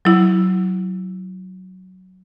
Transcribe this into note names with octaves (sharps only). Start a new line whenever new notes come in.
F#3 E4